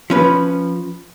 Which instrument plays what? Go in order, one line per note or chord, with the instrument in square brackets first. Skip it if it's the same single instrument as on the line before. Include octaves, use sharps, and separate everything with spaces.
[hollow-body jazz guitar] F3 C#4 B4